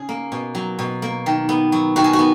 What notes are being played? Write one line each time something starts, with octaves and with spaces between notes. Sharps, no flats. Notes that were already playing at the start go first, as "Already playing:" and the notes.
Already playing: C#3 G#4
A#3
B2
F#3
B2
A#3
D#3
B3
F#3
D#3 F#4
G#4
F#4
B3